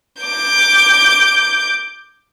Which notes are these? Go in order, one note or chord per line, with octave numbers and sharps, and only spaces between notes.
D6 G6